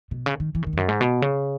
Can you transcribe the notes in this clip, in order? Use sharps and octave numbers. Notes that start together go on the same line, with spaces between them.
B2
C#3
D#3
E3
C#3
D#3
E2
F#2
G#2
B2
C#3